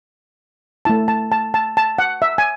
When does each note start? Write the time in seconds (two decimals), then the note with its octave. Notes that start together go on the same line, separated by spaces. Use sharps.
0.85 A3 E4 A5
1.08 A5
1.32 A5
1.54 A5
1.77 A5
1.99 F#5
2.22 E5
2.38 G#5